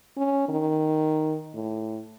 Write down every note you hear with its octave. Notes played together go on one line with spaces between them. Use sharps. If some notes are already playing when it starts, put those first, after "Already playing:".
C#4
D#3
A2